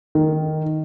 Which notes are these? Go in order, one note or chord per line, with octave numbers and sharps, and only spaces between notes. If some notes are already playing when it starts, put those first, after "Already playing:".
D#3